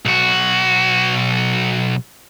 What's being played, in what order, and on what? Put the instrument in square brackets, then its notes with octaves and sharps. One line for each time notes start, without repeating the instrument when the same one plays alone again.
[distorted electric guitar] B1 F#4